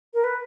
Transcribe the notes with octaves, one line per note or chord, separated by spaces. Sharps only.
A#4
B4